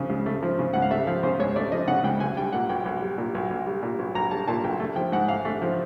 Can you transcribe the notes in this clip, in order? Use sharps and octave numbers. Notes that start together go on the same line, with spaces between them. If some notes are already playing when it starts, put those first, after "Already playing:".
Already playing: C#3 F3
C#2
A3
F3
C#3
C#2 F#5
F5
A3 E5
F3 F5
C#3 C5
C#2 C#5
A3 D5
F3 D#5
C#3 F#5
C#2 G5
B1 G#5
G3 G5
A#2 F#5
B1 G5
B1
G3
A#2
B1
B1
G3
A#2
B1
B1 A#5
G3 A5
A#2 A5
B1 G5
A3
F3 G5
G#2 F#5
A1 F5
A3
F3